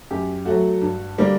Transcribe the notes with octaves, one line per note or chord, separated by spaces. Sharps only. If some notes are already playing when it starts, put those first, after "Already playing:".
F#2 G4
F#3 A3 F#4
G2
D3 G3 A#3